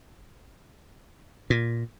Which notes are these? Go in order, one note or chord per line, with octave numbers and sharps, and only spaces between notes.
A#2